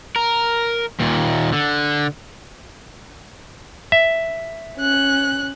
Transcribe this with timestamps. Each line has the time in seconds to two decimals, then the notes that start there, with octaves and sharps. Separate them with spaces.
0.16 A#4
1.00 D#2 A#2
1.53 D3
3.92 E5
4.77 C#4 F#6